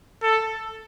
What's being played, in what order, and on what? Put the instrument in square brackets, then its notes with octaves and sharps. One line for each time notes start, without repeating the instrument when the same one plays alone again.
[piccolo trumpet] A4